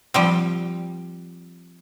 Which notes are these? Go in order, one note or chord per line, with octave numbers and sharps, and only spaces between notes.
F3 G3 C4